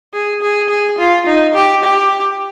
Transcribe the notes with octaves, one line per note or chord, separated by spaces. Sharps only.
G#4
G#4
G#4
F4
D#4
G4
G4